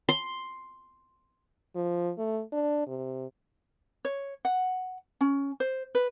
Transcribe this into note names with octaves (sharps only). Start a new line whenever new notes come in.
C6
F3
A3
D4
C3
C#5
F#5
C#4
C5
B4